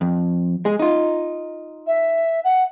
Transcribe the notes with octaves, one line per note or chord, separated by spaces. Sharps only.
F2
G#3 G#4
D#4 F4
E5
F#5